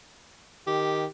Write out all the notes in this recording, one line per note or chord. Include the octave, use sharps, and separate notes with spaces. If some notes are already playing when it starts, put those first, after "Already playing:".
D#3 G4